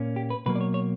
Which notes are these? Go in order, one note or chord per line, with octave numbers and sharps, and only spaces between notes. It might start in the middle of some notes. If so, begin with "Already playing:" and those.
Already playing: A#2 A#3 C#4
G4
B4
B2 F#3 A#3 B4
D5
C#5
C#5